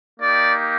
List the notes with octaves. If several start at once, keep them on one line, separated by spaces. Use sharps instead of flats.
A#3 D#4 G4 D5